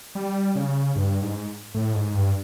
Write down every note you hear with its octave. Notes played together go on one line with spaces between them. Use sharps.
G3
C#3
G2
G#2
A2
G#2
G2